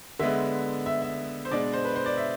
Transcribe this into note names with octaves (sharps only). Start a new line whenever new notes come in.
D3 G#3 B3 E5
E5
E5
C5
B2 G#3 D4 D5
C5
B4
C5
D5
E5